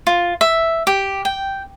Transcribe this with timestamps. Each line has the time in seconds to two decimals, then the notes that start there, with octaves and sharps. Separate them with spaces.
0.07 F4
0.41 E5
0.87 G4
1.25 G5